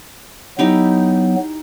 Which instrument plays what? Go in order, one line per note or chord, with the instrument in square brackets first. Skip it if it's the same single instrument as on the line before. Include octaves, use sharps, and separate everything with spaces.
[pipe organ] F#3 B3 [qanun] D#4 E4 G4